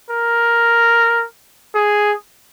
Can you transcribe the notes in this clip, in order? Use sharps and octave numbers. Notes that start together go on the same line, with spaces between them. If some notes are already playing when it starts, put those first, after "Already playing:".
A#4
G#4